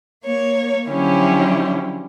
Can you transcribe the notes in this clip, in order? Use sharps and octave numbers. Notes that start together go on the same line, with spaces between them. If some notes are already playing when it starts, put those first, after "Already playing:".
A#3 C#5
D3 F3 F#3 C#4 E4 G4